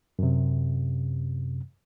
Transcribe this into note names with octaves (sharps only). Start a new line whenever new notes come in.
F#2 C3